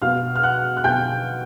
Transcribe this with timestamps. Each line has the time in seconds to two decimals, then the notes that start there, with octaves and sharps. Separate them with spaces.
0.02 B2 F5 F6
0.35 F6
0.43 F#5 F#6
0.77 F#6
0.84 B2 G5 G6